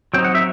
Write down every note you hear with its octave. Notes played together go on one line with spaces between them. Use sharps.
F#3 C4 D#4 G5
F#5
E5